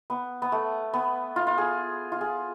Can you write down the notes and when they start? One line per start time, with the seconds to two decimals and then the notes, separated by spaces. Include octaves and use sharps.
0.10 B3
0.42 B3
0.52 A3
0.94 B3
1.36 F4
1.47 F4
1.58 G#4
2.12 F4
2.21 G#4